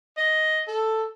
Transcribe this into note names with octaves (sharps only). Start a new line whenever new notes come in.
D#5
A4